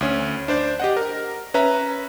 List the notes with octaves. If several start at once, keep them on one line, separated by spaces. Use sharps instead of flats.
D2 C#4
D4 C5 D5
G4 D#5 F#5
A#4
C#4 B4 E5 A#5